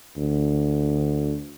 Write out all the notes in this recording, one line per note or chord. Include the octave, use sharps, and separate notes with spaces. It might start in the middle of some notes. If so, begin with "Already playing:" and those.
D2